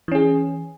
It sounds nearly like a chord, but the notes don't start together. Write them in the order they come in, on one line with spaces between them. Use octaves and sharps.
E3 C#4 G#4